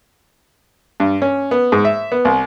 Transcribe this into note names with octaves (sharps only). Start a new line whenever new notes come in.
G2
C#4
B3
G#2
E5
B3
C2